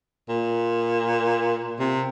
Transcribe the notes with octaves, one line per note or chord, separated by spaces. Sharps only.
A#2
C3